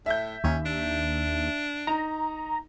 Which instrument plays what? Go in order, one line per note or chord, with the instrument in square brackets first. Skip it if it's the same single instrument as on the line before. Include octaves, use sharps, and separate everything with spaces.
[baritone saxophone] A2 [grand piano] E5 G6
[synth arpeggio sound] D#2 [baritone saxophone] C#4
[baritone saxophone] D4
[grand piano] D#4 [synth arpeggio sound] A#5